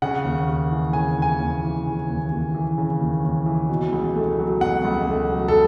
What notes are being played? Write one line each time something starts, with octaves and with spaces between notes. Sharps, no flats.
C#3 F#5
D#2
D#2
E3
C#3 G#5
D#2 G#5
D#2
E3
C#3
D#2
D#2
E3
C#3
D#2
D#2
E3
B2
C#2
A3
F#3
B2 F#5
C#2
A3
F#3
A4